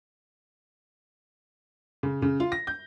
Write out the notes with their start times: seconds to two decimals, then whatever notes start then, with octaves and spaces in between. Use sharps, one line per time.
2.03 C#3
2.22 C#3
2.40 F4
2.52 A#6
2.67 G6